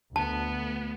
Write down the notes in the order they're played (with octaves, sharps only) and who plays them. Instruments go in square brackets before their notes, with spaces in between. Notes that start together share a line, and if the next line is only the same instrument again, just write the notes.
[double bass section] D2 [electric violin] B3 [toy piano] A5